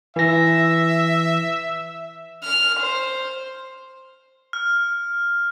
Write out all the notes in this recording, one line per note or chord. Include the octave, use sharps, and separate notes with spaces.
E3 E5 A#6
F6
C5
F6